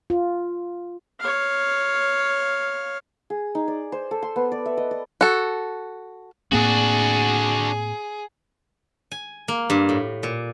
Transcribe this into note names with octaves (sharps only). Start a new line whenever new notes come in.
F4
C#5 F5
G#4
D#4
D5
C5
A4
C6
B3
D5
E5
D#5
D5
F#4 A4
A2 A#3 C4 D4 F#4 G#4
G#5
A#3
G2
A2
A#2